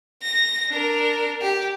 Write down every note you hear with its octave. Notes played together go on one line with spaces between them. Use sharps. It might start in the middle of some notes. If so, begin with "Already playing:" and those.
A#6
D4 A#4
G4